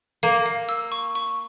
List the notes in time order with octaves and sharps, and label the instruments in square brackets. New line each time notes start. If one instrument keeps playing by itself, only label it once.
[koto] A#3 [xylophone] F5
[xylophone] F5
E6
C#6
C#6